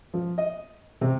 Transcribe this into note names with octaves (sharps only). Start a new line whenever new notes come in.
F3
D#5
C3